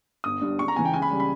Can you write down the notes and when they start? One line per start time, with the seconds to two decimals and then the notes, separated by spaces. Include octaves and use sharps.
0.24 G1 D#6
0.41 G2 G3
0.59 C#2 C#6
0.68 A#5
0.76 C#3 E3 G#5
0.85 G5
0.93 C#2 G#5
1.02 B5
1.11 C#3 G3
1.20 B5